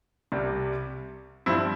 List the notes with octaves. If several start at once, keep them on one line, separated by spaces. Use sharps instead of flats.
C2 C3 G3
G2 F3 C4 E4